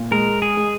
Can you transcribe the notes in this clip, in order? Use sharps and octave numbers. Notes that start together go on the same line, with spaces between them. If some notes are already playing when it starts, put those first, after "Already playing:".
Already playing: A#2
G#3 A#4
G#4
G#3